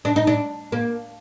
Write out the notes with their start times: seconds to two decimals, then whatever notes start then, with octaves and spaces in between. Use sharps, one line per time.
0.05 D4
0.16 D#4
0.27 D4
0.72 A#3